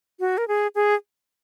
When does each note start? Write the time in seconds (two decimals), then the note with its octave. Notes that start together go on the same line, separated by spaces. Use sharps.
0.20 F#4
0.38 A#4
0.48 G#4
0.75 G#4